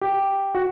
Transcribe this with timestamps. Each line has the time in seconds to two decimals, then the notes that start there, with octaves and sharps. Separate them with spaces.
0.01 G4
0.55 F#4